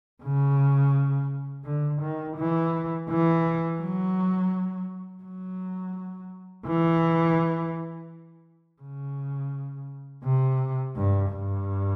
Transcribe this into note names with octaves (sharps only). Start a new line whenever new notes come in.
C#3
D3
D#3
E3
E3
F#3
F#3
E3
C#3
C3
G2
G2